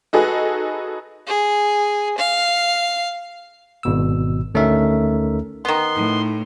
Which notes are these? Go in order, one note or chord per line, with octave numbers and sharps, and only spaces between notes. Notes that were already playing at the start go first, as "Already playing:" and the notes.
D#4 F#4 G#4 A4 B4
G#4
F5
G#1 B2 E6
D2 A3 C#4 D#4 A#4 E5
D#3 B3 C6
A2 D#4